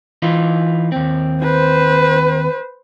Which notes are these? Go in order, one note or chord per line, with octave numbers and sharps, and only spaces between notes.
E3 D#4 F4
D#2 C4
B4 C5